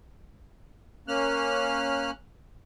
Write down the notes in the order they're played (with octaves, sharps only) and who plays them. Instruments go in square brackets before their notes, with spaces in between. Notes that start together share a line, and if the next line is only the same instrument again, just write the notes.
[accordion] A#3 C#4 F6 F#6